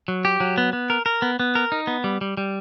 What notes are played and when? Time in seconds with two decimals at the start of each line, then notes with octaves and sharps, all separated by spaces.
0.08 F#3
0.25 G4
0.40 F#3
0.58 B3
0.73 B3
0.90 A#4
1.06 A#4
1.22 B3
1.40 B3
1.55 A#4
1.72 D#4
1.87 B3
2.04 G3
2.21 G3
2.37 G3